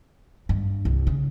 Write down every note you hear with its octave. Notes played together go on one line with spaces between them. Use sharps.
G2
C2
C#3